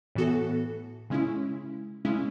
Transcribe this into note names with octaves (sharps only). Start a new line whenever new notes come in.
A2 E3 B3 F#4 A4
C#3 G#3 C#4 E4
C#3 G#3 C#4 E4